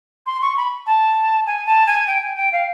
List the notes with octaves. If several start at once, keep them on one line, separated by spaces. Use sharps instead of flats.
C6
C#6
B5
A5
G#5
A5
G#5
G5
G#5
G5
F5